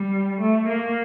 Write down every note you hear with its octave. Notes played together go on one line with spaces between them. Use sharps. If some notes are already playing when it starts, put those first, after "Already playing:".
Already playing: G3
A3
A#3